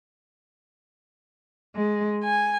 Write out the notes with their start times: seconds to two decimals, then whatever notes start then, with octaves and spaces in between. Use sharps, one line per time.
1.74 G#3
2.23 G#5